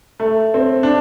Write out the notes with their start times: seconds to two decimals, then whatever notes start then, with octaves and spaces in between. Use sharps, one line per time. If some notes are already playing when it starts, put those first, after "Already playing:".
0.20 A3
0.54 C4
0.83 D4